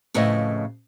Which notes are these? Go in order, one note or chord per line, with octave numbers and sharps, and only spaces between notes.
F2 A2 C#3 E4 B4 D#5